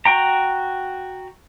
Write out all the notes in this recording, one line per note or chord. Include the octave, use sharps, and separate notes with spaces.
F#4 G5 A#5